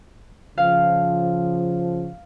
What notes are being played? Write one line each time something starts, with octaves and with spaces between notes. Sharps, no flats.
C#3 F3 F5